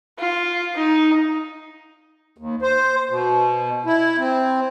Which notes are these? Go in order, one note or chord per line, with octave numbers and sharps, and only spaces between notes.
F4
D#4
D#2
C5
B2
E4
C4